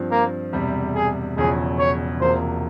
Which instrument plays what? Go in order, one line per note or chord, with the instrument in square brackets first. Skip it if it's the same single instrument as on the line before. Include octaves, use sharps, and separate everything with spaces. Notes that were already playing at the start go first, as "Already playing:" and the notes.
Already playing: [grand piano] G2 F3 C4
[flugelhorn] A#3
[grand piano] E1 E2 C3 G3
[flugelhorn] G#4
[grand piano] E1 E2 C#3 F3 [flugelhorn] G#4
[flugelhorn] C#5
[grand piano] E1 E2 C3 F3 A#3 [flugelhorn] C5